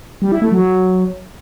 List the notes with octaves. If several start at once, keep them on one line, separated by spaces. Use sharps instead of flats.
G3
E4
A3
F#3